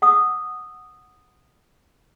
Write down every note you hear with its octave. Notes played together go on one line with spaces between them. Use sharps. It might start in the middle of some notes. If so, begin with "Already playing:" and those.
F#5 D#6 E6